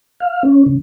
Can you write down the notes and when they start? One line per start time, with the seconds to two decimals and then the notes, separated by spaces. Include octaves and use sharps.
0.20 F5
0.43 C#4
0.66 C#3